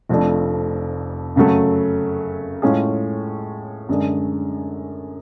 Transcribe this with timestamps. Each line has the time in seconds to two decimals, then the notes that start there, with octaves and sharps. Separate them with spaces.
0.09 F1 F2 F3 A3 D4
1.36 F#2 C#3 F#3 A3
2.62 A2 G#3 C#4 F4 G#4
3.89 F#2 D3 G#3 D4